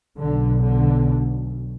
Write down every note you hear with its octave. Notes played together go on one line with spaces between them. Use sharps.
B1 B2 D3
D3